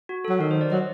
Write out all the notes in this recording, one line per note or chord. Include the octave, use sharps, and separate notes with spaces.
F#4
F#3 A4
D#3 A#4
C5
D5
F#3 D#5